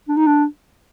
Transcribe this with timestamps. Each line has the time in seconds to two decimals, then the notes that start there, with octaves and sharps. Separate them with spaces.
0.08 D4
0.16 D#4
0.26 D4